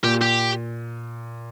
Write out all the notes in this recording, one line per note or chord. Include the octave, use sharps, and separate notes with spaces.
A#2 G4
G4